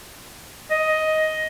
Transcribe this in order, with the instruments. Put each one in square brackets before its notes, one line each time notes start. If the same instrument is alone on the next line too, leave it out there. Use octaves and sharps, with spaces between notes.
[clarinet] D#5